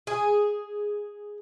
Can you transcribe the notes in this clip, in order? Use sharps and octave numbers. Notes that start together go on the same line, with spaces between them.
G#4